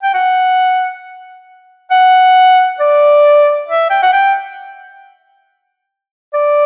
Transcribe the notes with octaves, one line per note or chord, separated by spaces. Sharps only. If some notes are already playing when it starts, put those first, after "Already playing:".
G5
F#5
F#5
D5
E5
G5
F#5
G5
D5